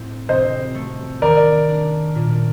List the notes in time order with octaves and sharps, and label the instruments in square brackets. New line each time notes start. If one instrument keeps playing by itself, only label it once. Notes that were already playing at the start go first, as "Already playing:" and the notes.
Already playing: [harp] A2 C4
[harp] C3 [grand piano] C5 D#5
[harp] A3
[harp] D#3 [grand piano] A#4 D5
[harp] D4
A#2